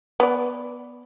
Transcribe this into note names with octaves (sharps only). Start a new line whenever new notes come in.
B3 D5